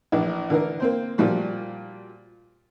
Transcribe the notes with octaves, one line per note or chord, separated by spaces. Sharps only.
A#1 E3 D4
D3 E3 A#4
A#3 C4 C5
A#2 F3 G3 F#4